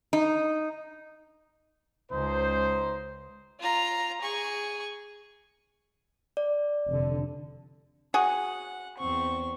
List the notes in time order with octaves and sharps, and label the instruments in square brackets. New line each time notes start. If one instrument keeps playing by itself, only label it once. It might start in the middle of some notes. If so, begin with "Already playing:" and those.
[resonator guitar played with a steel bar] D#4
[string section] C#2 [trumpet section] D#4 C5
[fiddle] F4 A#5
G#4 C#6
[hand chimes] D5
[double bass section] F1 D3
[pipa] F#4 G#4 [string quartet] F#5
[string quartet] E2 C4 C#6